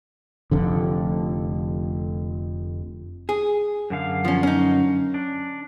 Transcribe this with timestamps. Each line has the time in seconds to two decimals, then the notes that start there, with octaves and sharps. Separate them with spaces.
0.51 F1 F2 D3
3.29 G#4
3.90 F#2 D3 F5
4.25 F3 C#4
4.43 C#4 D#4
5.14 D4